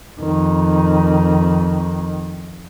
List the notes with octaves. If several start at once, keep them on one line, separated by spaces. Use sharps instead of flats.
F2 D#3